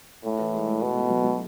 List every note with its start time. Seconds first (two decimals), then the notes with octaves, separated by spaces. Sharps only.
0.24 A2 A3
0.39 E3
0.53 G#3
0.67 A3
0.82 B2 B3
0.96 A3
1.10 F#3
1.24 F#3